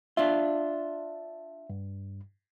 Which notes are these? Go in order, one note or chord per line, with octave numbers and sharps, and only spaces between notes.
D4 F4 E5
G2